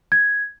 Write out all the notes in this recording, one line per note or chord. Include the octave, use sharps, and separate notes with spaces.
G#6